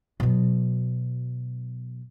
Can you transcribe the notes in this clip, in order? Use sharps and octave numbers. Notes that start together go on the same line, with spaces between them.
B2 F#3